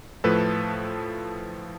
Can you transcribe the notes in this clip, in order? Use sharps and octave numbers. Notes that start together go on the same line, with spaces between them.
A2 F3 A3 A4 B4